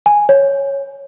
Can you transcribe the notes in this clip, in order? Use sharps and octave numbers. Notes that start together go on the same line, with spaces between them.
G#5
C#5